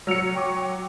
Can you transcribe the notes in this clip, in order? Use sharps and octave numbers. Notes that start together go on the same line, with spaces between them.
F#3 E6 F6 C#7 F7
G5 C#6 D6
G5 C#6